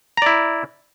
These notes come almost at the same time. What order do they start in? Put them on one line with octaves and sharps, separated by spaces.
A#5 D5 E4